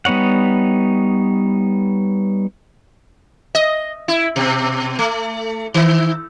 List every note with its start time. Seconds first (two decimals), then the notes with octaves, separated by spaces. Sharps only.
0.05 G3 B3 D#4 C#5 F#5
3.55 D#5
4.08 E4
4.36 B2
4.99 A3
5.74 D#3